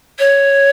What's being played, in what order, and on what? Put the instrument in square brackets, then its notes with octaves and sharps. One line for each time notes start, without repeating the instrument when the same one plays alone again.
[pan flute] C#5